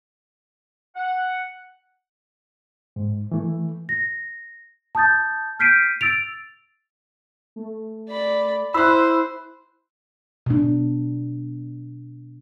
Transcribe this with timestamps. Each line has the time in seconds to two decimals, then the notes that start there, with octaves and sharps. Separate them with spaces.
0.96 F#5
2.96 G#2
3.32 E3 A3
3.89 A#6
4.95 A5 D#6 G6 A6
5.59 F6 G6 B6 C7 D7 D#7
6.01 E6 A6 D7 F7
7.56 A3
8.09 D5 B5
8.74 E4 C5 B5 E6 F#6
10.46 B2 D4